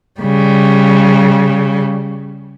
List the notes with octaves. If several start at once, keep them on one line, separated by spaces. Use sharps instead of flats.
C#3 G3